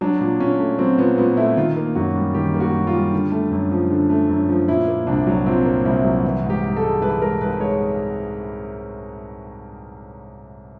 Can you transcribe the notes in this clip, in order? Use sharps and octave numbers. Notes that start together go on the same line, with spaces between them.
F#3 D4
A#2
A#2 C#4
A3
F#3 C4
A#2 B3
A#2 B3
A3 E4
D#3 F4
A#3
F#2 F#4
G3
D#3 G4
A#3
F#4
F#2
F4
G3
D3
A3
F#2
F3
D3
A3
F#2
F3
A#2 E4
A#3
C2 D4
F#3
A#2 C4
A#3
C2 E4
F#3
E3
G#2
G4
G#2
A4
G#3
E3 B4
G#2 A#4
G#2 B4
G#3 C#5